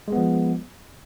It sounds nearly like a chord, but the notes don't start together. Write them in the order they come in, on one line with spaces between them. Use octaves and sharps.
G#3 B3 F3